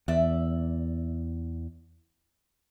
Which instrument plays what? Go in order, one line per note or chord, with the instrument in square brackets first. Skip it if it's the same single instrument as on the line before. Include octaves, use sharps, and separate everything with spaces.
[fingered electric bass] E2 [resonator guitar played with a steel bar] D5 E5